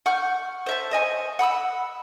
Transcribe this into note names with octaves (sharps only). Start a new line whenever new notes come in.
F#5 C#6 F6 G6
C5 E5 A5
C5 D#5 G#5 C#6
F#5 B5 D#6 E6